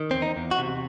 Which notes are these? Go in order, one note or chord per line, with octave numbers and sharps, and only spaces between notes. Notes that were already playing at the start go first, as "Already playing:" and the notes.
Already playing: D#3
E2 C4
D#4
E2
F#4
C3